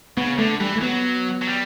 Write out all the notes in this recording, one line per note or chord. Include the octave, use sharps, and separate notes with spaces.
C#3 B3
D3 A3
E3 G3
A3
F#3 B3
F#3
G3